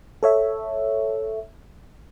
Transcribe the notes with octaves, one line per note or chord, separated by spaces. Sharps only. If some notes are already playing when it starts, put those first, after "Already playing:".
A4 C#5 E5